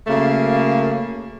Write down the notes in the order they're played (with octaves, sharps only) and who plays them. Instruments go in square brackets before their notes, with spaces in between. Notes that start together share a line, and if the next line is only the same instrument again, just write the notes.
[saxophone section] C#3 F#3 A3 A#3